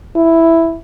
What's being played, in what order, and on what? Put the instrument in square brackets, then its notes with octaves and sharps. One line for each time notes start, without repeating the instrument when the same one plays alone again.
[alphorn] E4